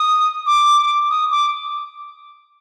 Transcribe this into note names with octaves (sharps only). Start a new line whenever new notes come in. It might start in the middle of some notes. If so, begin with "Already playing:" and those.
Already playing: D#6
D6
D#6
D6